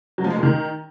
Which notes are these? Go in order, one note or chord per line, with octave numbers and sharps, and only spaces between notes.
F#3
F3
G#3
A#2
D#3